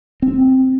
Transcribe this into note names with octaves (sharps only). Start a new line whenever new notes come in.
C4